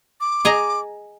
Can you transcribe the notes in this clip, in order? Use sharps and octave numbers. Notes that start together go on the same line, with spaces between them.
D6
G#4 D#5 A#5